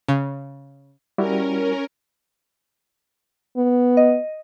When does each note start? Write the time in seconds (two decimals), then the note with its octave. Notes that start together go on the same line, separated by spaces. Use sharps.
0.08 C#3
1.18 G3 C#4 E4 F#4 A#4
3.57 B3
3.97 D#5